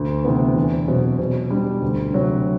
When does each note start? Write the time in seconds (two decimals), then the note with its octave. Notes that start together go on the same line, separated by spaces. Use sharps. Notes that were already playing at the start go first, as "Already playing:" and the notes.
Already playing: D2
0.24 C3 E3 B3
0.56 E2
0.88 B2 F#3 C4
1.19 B2
1.51 G3 D4
1.82 D2
2.14 C3 F#3